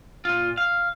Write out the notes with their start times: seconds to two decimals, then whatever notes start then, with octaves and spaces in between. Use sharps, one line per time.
0.25 A#2 F4
0.57 F5